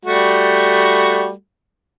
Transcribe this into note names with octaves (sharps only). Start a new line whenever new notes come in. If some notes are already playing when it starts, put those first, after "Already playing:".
G3 A3 F#4